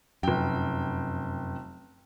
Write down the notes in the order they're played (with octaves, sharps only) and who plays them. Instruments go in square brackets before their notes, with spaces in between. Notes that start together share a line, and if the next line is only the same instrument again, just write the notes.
[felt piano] F1 G5 [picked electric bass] F#2